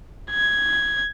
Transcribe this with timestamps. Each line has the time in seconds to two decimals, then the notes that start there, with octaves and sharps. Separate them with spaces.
0.31 G#6